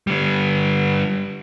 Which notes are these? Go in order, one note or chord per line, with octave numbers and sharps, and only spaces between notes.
D3 G3